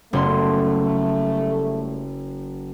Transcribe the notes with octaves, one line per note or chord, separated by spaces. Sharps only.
F#1 G3 A3 B3 C6